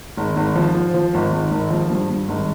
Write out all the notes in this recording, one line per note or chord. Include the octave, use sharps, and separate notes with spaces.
G#1
G#1
F3
F3
F3
G#1
G#1
G#1
F3
G2
G2
G#1